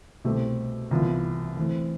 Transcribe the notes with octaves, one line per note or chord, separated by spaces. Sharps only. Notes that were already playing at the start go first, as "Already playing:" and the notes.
C2 B2 A3 C4 G4
C2 C3 E3 B3 F4
E3 A3 C4